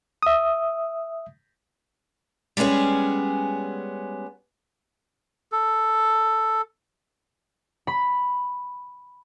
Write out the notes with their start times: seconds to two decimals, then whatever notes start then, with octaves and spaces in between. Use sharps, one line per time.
0.23 E5 D#6
2.57 G3 G#3 B3 C#4 G#4
5.52 A4
7.87 B5